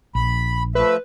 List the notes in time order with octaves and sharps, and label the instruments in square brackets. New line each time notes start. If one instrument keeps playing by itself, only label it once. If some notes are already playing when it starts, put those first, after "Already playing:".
[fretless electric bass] A#1 [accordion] B5
[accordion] F3 A3 E5 [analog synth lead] B4